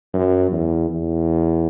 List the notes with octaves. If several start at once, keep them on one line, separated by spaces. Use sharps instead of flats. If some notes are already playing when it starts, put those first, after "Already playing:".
F#2
E2
E2